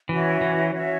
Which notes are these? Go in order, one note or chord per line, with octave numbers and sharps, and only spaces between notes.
E3 C#4 F#4 C#5 E5
E3
C#4 F#4 C#5 E5